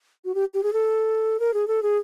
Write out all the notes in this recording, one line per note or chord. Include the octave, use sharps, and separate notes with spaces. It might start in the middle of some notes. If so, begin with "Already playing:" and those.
F#4
G4
G4
G#4
A4
A#4
G#4
A4
G#4